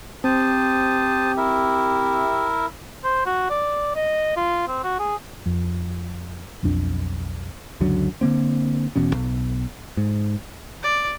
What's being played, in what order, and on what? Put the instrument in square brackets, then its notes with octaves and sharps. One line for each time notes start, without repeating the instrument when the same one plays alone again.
[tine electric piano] C4 [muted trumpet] G4 [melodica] C5 A5 D#6
[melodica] E4 A#4 E5
[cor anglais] C5
F#4
D5
D#5
F4
C4
F#4
G#4
[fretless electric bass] F2
B1 F2 D4
[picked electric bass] C#2 F#2 D3 F#3
D3 F3 A#3 C4
E1 E2 B2 C#4
B1
G#2
[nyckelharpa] D5